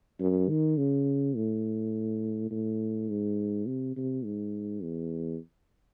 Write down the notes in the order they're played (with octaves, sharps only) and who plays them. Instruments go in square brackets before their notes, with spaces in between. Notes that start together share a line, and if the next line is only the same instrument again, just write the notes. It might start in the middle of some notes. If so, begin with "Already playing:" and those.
[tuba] F#2
D#3
C#3
A2
A2
G#2
C3
C3
G#2
E2